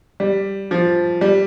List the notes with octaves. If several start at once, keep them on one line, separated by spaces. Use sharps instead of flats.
G3
F3
G3